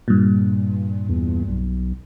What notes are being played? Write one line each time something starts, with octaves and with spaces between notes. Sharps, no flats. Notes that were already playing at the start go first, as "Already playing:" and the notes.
G2 A#2
E2
B1